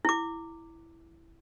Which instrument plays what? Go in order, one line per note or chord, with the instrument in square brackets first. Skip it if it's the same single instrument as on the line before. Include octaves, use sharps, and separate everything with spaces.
[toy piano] E4 D6